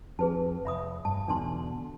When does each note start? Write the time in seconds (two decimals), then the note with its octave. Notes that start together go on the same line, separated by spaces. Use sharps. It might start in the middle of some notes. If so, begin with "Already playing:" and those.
0.19 F2 G#4 B4 A5
0.65 F1 E5 B5 D#6
1.05 G2 A5
1.28 E2 B2 D3 D4 A5 C6